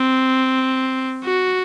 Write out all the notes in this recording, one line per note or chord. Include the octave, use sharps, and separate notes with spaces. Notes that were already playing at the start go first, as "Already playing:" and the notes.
Already playing: C4
F#4